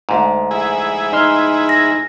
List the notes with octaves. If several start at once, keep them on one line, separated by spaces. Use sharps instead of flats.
D2 G#2
E4 G#4
D#4 C6 F6
A#6